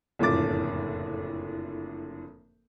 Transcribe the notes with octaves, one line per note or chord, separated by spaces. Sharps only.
F#1 F2 A2 D3 D6 A6